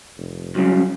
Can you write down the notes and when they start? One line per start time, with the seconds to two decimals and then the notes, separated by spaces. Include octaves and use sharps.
0.17 F1
0.55 C2 C#3 F#3